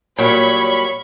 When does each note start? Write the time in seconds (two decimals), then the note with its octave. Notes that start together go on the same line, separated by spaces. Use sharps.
0.18 A#2 F#3 G3 C#5 B5 C#6